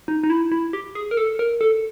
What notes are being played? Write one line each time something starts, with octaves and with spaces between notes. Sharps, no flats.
D#4
D#4
E4
E4
G4
G#4
A#4
A4
A#4
A4